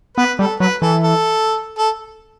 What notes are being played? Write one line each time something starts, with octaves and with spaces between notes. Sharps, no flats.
B3 B4
G3 A4
F#3 B4
E3 A4
A4
A4